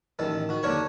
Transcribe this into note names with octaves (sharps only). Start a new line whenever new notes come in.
A1 D#3 A4
D#3 F#4
D#2 D3 D4 A#4 C#5 C#6